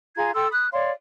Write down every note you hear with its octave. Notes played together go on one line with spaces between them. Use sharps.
F4 G#4 A#5 G#6
A4 G5 C6 E6
B5 D#6 F#6
C#5 D5 F5 C6